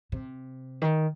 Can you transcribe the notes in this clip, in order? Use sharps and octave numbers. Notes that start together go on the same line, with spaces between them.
C3
D#3